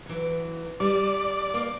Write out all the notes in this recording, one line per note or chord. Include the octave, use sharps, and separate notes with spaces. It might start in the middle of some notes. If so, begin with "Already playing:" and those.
E3 F#3
G3 D5
A#3